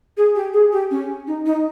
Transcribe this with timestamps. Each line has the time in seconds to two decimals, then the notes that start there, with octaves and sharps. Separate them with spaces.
0.17 G#4
0.35 G4
0.53 G#4
0.72 G4
0.91 C#4
1.27 D#4
1.46 D#4